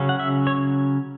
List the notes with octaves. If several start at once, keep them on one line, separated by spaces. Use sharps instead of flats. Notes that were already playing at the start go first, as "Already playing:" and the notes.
Already playing: C#3 F#3 C#4
F#5
E5
C#5